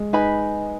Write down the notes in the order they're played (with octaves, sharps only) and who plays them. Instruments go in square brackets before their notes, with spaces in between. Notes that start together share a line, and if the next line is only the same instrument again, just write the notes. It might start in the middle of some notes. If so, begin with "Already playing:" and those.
Already playing: [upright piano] G#3
[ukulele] D#4 B4 G#5 B5